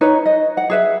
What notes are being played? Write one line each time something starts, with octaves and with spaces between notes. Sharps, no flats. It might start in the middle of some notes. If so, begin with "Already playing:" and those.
D#4 B4 C#5
D#5
F#5
G#4 B4 E5